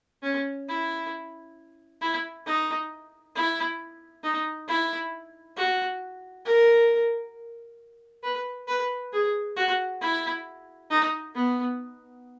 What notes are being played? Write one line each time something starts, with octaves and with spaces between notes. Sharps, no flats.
C#4
E4
E4
D#4
E4
D#4
E4
F#4
A#4
B4
B4
G#4
F#4
E4
D#4
B3